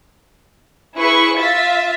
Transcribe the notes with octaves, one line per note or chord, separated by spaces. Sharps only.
E4 G#4 B4 C#6
F4 E5 A6 B6